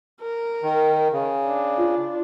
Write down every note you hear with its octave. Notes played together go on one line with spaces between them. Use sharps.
A#4
D#3
C#3
D4
F4